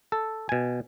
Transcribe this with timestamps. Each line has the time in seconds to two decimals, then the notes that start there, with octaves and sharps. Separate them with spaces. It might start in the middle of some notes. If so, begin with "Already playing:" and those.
0.12 A4
0.49 B2 G#5